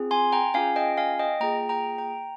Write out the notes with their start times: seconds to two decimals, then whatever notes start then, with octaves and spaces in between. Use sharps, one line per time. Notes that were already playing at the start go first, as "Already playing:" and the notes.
Already playing: C4 F4 G#4
0.11 G#5 C6
0.32 G5 A#5
0.54 C#4 F4 G#4 F5 G#5
0.76 D#5 G5
0.97 F5 G#5
1.19 D#5 G5
1.40 A#3 F4 G#4 G5 A#5
1.69 G5 A#5
1.98 G5 A#5